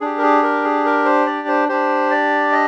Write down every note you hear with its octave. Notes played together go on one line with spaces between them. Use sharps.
D4 G4 G#4
A#4
G#4
A#4
G#4
A#4
C5
D5
C5
D4 G4 C5
D5
D#5